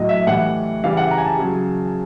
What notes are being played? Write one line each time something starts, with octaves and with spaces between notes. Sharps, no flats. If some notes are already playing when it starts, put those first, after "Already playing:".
Already playing: A2 F#3 D#5
E5
A2 E3 G3 F#5
C#3 E3 G3 F5
F#5
A#5
G#5
A5
C#3 F#3